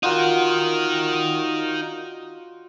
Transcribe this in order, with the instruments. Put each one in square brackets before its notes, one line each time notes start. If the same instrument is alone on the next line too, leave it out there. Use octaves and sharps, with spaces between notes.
[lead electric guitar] D#4 A#4 [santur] F4 F#4 D5